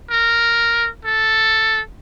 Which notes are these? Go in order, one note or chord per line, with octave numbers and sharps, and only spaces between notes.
A#4
A4